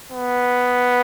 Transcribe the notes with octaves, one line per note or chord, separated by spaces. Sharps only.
B3